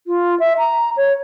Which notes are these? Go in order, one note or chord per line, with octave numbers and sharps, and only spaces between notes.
F4
E5
A#5
C#5